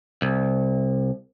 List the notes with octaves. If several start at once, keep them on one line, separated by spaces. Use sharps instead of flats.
C2